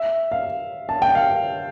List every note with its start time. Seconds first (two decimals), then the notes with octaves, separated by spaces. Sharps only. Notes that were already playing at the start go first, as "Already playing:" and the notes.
Already playing: E5
0.32 F5
0.89 A5
1.02 G5
1.15 F5